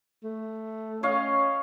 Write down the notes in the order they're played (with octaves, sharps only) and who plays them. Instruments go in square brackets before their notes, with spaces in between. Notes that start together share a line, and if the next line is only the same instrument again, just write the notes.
[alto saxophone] A3
[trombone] C#4 [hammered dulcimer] C#5 D#5 F5